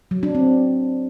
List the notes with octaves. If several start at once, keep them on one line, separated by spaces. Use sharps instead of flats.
F#3
D4
C4